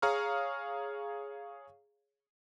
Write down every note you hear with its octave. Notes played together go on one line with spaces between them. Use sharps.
G#4 C#5 F5 A#5 C#6 F6